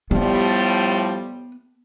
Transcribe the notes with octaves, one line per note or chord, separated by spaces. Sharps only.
A2 F3 G3 B3